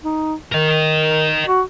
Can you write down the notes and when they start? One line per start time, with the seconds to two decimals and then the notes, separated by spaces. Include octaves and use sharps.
0.03 D#4
0.52 D#3 A#4 D#5
1.46 F#4